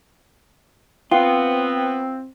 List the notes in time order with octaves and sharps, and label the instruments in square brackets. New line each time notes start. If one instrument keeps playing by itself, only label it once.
[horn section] B3 [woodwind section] C4 [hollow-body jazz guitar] F4 [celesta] G5